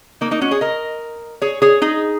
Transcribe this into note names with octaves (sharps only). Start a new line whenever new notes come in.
A#3 D#4
A#3 D#4
C#4 F#4
G#4 C#5
A#4 D#5
G#4 C#5
G#4 C#5
D#4 G#4